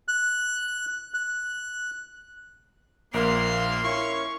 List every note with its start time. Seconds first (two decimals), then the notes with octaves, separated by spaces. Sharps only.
0.08 F#6
1.14 F#6
3.14 A#1 A#3 A#4 F5 C6
3.84 C#4 E4 C#5 C#6